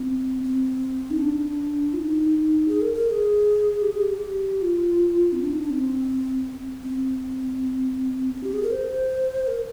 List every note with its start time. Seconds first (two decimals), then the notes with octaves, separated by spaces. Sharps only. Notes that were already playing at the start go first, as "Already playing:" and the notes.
Already playing: C4
0.43 C4
1.11 D#4
1.18 D4
1.93 F4
1.97 D#4
2.68 G#4
2.81 A#4
2.94 A#4
3.07 A#4
3.10 G#4
3.82 G4
3.92 G#4
4.02 G4
4.57 G4
4.62 F4
5.33 C4
5.42 D4
5.52 D#4
5.61 D4
5.70 C4
6.83 C4
8.34 C4
8.44 G4
8.53 G#4
8.63 A#4
8.71 C5
9.47 A#4